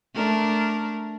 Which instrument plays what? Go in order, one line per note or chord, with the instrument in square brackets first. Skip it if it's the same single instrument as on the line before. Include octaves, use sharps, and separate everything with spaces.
[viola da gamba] A3 D4 A#4